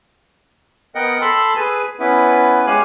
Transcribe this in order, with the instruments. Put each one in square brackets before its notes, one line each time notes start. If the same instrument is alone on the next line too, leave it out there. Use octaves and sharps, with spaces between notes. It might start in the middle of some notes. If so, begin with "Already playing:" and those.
[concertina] B3 A#4 D#5 F#5 G5
A4 A5 B5 C6 E6
G#4 B4 G#5
B3 C#4 E4 B4
G#3 G4 C#5 F5 G#5 F#6